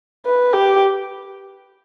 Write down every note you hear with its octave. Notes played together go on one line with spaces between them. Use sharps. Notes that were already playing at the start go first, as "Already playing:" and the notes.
B4
G4